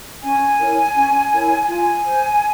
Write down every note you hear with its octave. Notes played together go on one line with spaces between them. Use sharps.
C#4 G#5
E4 A#4 C#5
C#4
E4 A#4 C#5
F4 G#5
C5